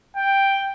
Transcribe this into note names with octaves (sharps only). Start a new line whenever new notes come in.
G5